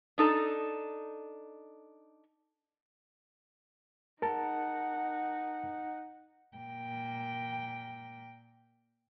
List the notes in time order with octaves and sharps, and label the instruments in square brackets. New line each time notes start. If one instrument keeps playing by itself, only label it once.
[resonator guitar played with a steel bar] D4 D#4 A4
[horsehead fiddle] D#4 F#5 [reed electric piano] A#4 A5
[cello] A#2 G5